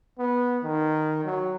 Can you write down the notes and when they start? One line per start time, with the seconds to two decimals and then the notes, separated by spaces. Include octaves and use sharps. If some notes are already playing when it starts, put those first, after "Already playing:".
0.19 B3
0.63 D#3
1.25 F#3